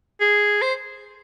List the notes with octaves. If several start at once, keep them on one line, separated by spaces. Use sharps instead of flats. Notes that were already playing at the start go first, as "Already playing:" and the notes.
G#4
C5